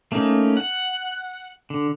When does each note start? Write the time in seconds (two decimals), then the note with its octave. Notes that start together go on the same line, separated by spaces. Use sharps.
0.12 A3 A#3 C#4 D#4
0.57 F#5
1.70 D3